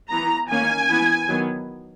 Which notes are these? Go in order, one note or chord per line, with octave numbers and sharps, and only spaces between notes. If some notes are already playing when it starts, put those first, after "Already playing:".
E3 B3 A#5
D#3 A#3 C#4 G#5
E3 B3
D#3 F#3 B3